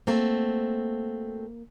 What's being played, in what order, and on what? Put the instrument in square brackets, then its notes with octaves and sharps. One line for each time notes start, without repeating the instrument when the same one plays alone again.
[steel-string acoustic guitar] A3 C4 F#4 [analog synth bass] A#3